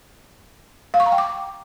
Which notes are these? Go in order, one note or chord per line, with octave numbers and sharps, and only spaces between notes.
F5
C#6
A#5
G5
D6